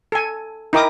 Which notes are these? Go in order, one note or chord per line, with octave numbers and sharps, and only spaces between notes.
A4 G#5
D#4 E4 A#4 G5 D6 D#6